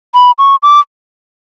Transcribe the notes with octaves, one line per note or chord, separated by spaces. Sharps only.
B5
C#6
D6